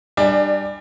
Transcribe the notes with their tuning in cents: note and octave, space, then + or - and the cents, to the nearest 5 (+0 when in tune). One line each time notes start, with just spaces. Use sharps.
G3 +5 D4 +30 G#5 +5